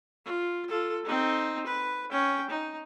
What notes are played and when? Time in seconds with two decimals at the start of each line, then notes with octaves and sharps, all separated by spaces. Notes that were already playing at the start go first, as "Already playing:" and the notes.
0.25 F4
0.68 F4 A4
1.05 C4 D#4
1.67 B4
2.11 C#4 G5
2.50 D#4